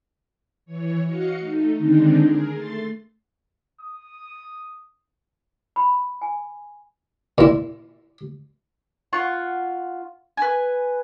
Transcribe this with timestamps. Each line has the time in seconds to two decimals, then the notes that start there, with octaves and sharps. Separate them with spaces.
0.65 E3 C#5
1.03 F#4 D#5 F5 C#7
1.39 A3 D#4
1.77 D3 D#3 G#3 C4 D4 D#4
2.16 G#4 A#4
2.51 A3 C6 A6 C7
3.81 D#6
5.76 B5
6.22 G#5
7.38 A#2 E4
9.13 F4 F#5 C#6
10.37 B4 G#5